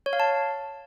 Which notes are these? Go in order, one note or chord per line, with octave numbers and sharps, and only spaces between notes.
C#5
F5
A5